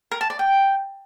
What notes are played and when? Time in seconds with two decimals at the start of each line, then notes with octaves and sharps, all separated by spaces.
0.12 A#4
0.21 A5
0.30 D5
0.39 G5